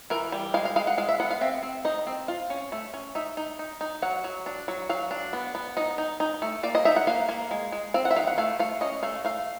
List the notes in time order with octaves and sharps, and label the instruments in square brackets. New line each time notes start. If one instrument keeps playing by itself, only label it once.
[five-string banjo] E3 A#4
G3
G#3 F5
F5
G#3 F5
F#5
G#3 F5
E5
B3 F#5
F5
C4 E5
C4
D#4 D#5
C4
F4
C#4
A3
C#4
D#4 E5
D#4
D#4
D#4
F#3 F#5
F#3
D4
F#3
F#3 F5
D4
B3
B3
D#4 D#5
D#4
D#4
A3
A#3 D5
D#5
D#4 E5
F#5
A#3 F5
A#3
G#3
G#3
C4 F5
F#5
E5
D#3 F5
F#5
A3 F5
A3 F5
C#4 D#5
A3 F5
A3 F5